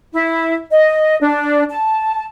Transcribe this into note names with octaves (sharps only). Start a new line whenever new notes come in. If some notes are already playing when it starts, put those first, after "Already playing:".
E4
D#5
D4
A5